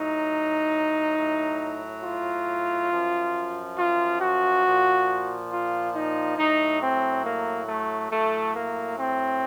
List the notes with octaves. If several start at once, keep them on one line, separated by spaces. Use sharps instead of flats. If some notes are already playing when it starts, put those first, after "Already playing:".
Already playing: A2 F#3 D#4
A2 F#3
F4
F#2 F3
F4
F#4
A#2 F3
F4
D#4
A2 F#3 D#4
C4
A#3
A3
A2 F#3 A3
A#3
C4